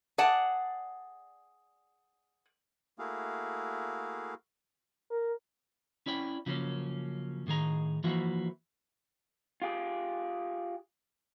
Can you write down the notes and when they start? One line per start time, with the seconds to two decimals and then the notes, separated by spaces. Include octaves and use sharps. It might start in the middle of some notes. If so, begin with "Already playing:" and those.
0.18 G#4 D5 F#5 A5
2.99 A3 A#3 E4 F#4 G#4 F5
5.10 A#4
6.06 C#4 E4 D5 G5
6.46 C#3 F3 F#3 A#3 C4 C#4
7.47 A2 D#3 G#4 A#5
8.04 E3 F3 A#3 E4 F#4
9.62 F4 G4 G#4